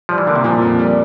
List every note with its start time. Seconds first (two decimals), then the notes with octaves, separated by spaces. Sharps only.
0.09 F3 G3
0.18 E3
0.27 D3 A#3
0.36 C3
0.44 A#2 F3
0.62 F2
0.79 G3